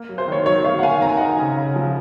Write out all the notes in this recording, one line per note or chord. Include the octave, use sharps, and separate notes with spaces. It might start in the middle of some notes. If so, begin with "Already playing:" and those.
Already playing: A#3
F#3
C5
D#3 C#5
F#3 C#5
F#3 C#5 F5
F#5
D#3 F5 G#5
C4 A#5
G#5
D#4 F#5 A#5
C#3
C#3
F3